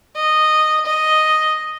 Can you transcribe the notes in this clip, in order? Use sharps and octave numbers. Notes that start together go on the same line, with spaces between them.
D#5
D#5